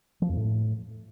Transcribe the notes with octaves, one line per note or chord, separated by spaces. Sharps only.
F3
F2
A2